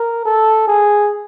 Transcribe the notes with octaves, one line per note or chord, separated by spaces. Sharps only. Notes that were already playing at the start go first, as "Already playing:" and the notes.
Already playing: A#4
A4
G#4